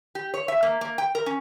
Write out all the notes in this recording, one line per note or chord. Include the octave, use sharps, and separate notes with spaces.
G4
C#5
E5
A#3
A#3
G5
A#4
C#4